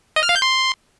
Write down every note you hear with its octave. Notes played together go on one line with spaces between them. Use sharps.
D#5
F6
F5
G6
C6